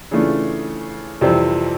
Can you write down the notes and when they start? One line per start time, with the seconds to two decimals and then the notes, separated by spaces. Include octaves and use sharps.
0.11 C#3 E3 A3 D4 F4
1.21 F2 C3 E3 G3 C4